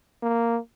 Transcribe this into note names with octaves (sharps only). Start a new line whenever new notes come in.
A#3